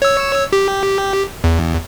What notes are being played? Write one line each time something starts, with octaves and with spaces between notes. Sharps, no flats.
C#5 E6
G4
E2